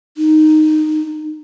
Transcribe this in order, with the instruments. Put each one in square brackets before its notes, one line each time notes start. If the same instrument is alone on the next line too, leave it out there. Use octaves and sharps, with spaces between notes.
[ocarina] D#4